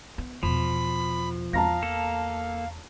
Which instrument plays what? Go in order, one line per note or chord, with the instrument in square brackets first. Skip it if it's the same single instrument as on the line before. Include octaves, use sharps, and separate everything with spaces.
[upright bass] B3
[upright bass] E2 B2 [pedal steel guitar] F3 [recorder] B5
[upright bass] E2 [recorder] F5 [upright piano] A5 A#5 A#6
[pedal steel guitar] A#3 A4